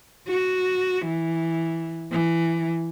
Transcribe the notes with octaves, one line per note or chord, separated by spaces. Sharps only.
F#4
E3
E3